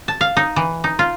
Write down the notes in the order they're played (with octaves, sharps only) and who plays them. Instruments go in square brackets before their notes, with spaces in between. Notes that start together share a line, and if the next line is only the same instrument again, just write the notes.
[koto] A5
F5
D#4
E3
D#4
F4